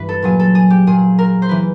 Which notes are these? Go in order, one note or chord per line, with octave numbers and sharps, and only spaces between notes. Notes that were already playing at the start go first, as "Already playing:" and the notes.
Already playing: G2 E3 B4
A4
A#2 F#3 G#4
A4
G#4
G4
A#2 F#3 G#4
A#4
C5
E3 B4